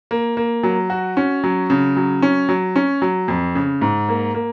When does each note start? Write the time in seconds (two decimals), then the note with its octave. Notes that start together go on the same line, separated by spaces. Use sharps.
0.11 A#3
0.37 A#3
0.63 F#3
0.90 F#4
1.17 C#4
1.44 F#3
1.70 C#3
1.97 F#3
2.22 C#4
2.49 F#3
2.76 C#4
3.02 F#3
3.28 F2
3.55 C#3
3.82 G#2
4.09 A#3
4.34 A#3